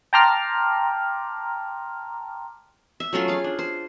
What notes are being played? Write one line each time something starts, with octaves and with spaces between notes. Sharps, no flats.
G5 A5 A#5 C6 D6 F6
E5
F#3 A3 C#4 F4
G#4 F5
D4
C5